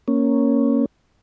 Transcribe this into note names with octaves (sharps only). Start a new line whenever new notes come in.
A#3 C#4